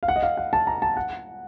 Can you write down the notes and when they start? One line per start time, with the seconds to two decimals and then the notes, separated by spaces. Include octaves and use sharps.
0.03 F5
0.08 F#5
0.16 D#5
0.23 F5
0.37 F#5
0.53 A5
0.67 A#5
0.82 A5
0.97 F#5